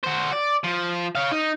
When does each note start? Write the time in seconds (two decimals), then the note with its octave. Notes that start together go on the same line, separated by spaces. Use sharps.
0.03 F#4 C5
0.33 D5
0.64 F3
1.15 C#5 F5
1.32 D#4